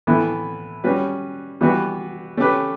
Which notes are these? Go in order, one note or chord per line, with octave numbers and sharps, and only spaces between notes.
A2 E3 B3 E4 A4
G3 C#4 F#4 B4
E3 G3 B3 F#4 B4
A3 C#4 G4 B4